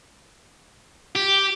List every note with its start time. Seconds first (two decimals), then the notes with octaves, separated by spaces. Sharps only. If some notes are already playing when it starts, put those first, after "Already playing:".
1.16 G4